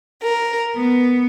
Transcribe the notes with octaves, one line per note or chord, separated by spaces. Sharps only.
A#4
B3